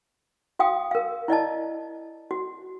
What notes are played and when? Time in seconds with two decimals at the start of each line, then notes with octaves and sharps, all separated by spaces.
0.59 F#4 F5 G5 D#6
0.91 A#4 F5
1.28 E4 D5 D#5 A5
2.31 F#4